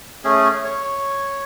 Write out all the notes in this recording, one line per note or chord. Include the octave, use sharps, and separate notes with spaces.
A3 C#4 G#4
C#5